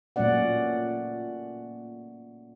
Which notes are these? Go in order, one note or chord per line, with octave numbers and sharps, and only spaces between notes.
A#2 F#3 A3 C#4 D5 F#5